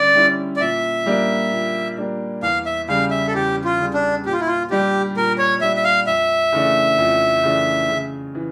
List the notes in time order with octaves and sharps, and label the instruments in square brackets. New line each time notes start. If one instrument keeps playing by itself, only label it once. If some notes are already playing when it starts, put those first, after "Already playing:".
Already playing: [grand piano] D3 G3 C#4 [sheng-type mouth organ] D5
[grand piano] G3 C#4 E4
[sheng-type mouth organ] D5
[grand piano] A#2 [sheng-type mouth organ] E5
[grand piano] G3 A#3 D4
A#2
G3 A#3 D4
[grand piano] E2 [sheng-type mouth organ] F5
[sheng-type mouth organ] E5
[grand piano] C#3 G3 [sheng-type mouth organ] F5
[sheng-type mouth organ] E5
A4
[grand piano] E2 [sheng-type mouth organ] G4
[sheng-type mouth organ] F4
[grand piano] C#3 G3
[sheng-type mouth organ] D4
[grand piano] A#2 [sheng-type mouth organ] G4
[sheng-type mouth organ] F4
E4
F4
[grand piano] G3 D4 [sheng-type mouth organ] G4
[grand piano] A#2 [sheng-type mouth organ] A#4
[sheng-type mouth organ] C#5
[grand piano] G3 D4 [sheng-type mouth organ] E5
[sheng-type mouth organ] E5
F5
[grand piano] F2 [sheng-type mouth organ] E5
[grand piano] C#3 E3 A3 D4
F2
C#3 E3 A3 D4
C#3
E3